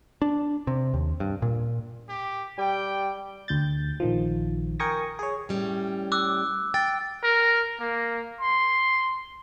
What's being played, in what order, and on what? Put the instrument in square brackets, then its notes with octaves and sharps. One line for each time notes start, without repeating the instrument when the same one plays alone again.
[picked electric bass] D4
C3
D#2
G2
A#2
[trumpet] G4
[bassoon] G3 [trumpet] G5
[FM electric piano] D2 G6 A6
A#1 D#3 F3
A#4 G5 G#5 C#6 D#6 A#6
G#4 C#5
[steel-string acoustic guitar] A2 G3 C#4
[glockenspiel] D6 E6 F#6
[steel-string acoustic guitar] G5 [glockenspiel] A6
[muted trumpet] A#4
A#3
C6